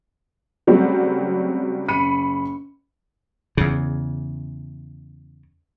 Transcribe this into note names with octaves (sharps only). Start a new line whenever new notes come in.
C#3 F#3 G3 A3 C4
F#1 B5 C#7 D#7
E2 C#3